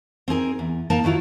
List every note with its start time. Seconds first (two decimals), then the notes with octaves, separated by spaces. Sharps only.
0.28 C4 D#4 G#4 A#4
0.59 E2
0.90 A#3 D#4 A#4 A5
1.04 D#3 F#3 E4 F4